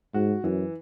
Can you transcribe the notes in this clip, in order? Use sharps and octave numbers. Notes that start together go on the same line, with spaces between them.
G#2 F#4
F#2 E3